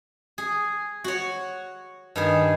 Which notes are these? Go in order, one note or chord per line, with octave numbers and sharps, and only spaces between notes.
G#4
F#4 C#5
G2 D#3 G#4